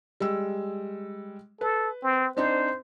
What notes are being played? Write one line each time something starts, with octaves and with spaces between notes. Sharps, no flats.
G3 G#3 E6
A4 B4
C4
C4 D4 D#4 C5